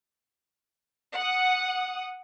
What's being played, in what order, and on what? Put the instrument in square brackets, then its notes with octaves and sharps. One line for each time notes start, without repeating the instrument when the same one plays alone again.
[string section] F#5 D#6